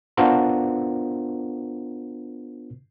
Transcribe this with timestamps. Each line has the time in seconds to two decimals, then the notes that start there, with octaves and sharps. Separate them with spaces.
0.17 B3 D4 F4 F#4 A#4 C5